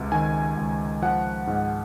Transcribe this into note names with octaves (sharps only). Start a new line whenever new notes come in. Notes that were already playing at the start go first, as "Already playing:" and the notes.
Already playing: C#2 C3
D#3 G#5
C#2
F3 F#5
G#2